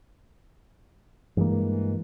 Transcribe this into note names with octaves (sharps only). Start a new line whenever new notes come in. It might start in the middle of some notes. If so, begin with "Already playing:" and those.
G2 E3 G#3 A#3